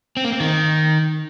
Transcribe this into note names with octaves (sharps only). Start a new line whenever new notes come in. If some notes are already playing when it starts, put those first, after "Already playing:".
C4
A#3
C4
D#3